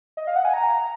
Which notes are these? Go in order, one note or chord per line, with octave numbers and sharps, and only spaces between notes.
D#5
F5
F#5
G#5
A#5